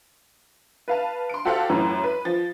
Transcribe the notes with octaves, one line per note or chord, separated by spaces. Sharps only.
B4 F5 A5
C6 D7
F#4 G4 A4 C5 F5 F#5
F#2 A2 E3
B4
F3 A6